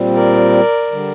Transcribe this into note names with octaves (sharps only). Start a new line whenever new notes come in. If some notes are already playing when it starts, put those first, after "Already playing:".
Already playing: A#2 G3 C4
A#4 D5
D3 G3